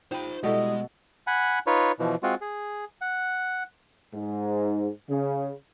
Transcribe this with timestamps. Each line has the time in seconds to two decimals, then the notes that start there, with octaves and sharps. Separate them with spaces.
0.12 D#4 F4 C5 G5 B5
0.44 B2 G3 G#3 E4 A4 D#5
1.27 F#5 G#5 B5
1.67 D#4 F4 B4 C#5
1.99 B2 E3 F3
2.23 G#3 C4 F4 F#4
2.41 G#4
3.01 F#5
4.14 G#2
5.08 C#3